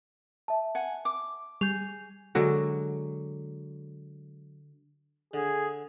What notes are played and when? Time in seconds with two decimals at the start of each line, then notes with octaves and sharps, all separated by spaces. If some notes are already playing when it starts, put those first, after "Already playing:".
0.48 E5 A5
0.75 F#5 G#5
1.05 D6
1.61 G3 G#4 G6 F7
2.35 D3 F#3 G#3
5.34 D3 G#4